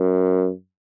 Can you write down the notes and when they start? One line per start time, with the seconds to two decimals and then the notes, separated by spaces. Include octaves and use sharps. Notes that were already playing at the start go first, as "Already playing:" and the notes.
Already playing: F#2